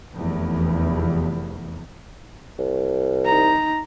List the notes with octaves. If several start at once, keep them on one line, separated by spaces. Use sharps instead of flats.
F1 E2
C2
D#4 A#5